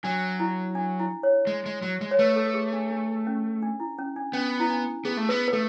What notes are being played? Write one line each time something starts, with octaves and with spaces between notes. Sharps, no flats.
F#3 D4
E4
D4
E4
C#5
G#3
G#3
F#3
G#3
C#5
A3 B4
A4
A4
G#4
D4
D4
C#4
D4
E4
C#4
D4
B3 C#4
E4
D4
B3 G#4
A3
B3 B4
B4
A3 A4